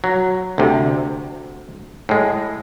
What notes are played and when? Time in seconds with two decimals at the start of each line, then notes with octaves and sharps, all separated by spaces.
0.04 F#3
0.58 D2 C3
2.09 A2 G#3